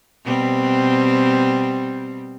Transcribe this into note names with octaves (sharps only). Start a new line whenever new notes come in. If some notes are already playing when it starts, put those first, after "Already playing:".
B2 G3 C4